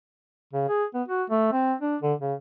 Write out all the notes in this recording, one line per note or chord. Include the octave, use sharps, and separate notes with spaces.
C#3
G#4
B3
F#4
A3
C4
D4
D3
C#3